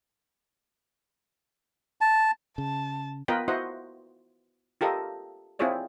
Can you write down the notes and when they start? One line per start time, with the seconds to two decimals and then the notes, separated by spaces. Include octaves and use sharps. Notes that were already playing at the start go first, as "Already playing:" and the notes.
2.01 A5
2.58 C#3 A5
3.28 B3 F4 A#4 B4 D#5 G5
3.48 E4 F#4 C5 D#5 F#5
4.81 F4 G4 A4 A#4 D#5
5.59 C4 E4 F4 G#4 C#5 D5